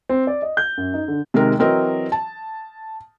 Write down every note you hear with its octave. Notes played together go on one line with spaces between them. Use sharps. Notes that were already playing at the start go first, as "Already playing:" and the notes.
C4
D5
D#5
G6
F#2
D#4
D3
C3 D#3 G#3 A#4
E3 F#3 C4 A#4 D#5
A5